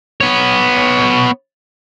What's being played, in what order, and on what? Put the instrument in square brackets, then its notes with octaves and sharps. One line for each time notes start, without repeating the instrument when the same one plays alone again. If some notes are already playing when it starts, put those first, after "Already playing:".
[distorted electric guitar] B3 C#5